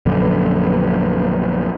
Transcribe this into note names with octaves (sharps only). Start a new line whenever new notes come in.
A#1 F#2 D3 D4